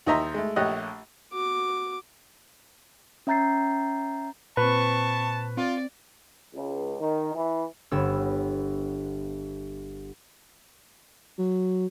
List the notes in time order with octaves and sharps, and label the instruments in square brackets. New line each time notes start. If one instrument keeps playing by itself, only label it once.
[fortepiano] D#2 D#3 D#5 E5 A#5 C6
G#3 A3
A#1 A3 G4 C#5 D#5 F#6
[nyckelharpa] F#4 D6
[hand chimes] C#4 E5 A#5 G6 A6 C7
[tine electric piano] A#2 [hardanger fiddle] C4 C#6 [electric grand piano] B4 [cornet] A5
[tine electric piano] C4 [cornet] F4 [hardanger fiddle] D5
[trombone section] C#2
D#3
E3
[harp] G1 B3 C#5 E6
[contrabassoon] F#3